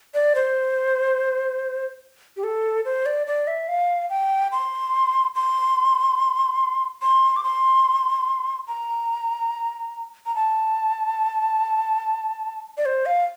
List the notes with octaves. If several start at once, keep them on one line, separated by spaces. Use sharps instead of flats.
D5
C5
G4
A4
C5
D5
D5
E5
F5
G5
C6
C6
C6
D6
C6
A#5
A#5
A5
D5
C5
F5